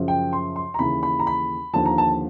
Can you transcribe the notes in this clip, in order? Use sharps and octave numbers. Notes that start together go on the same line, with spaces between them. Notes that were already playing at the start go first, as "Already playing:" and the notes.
Already playing: F#2 C#3 F3
G5
C6
C6
A#5
D#2 C#3 E3 B5
B5
A#5
B5
D#2 D3 F3 A5
A#5
A5